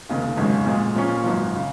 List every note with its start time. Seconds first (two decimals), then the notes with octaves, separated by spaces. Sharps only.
0.09 F1 D#2 C#3
0.37 G#1 F#2 C#3 G#3 C#4
0.66 A#2 F3 G#3
0.95 A#2 F3 A#3 C#4
1.24 G#1 F#2 F3
1.56 C#3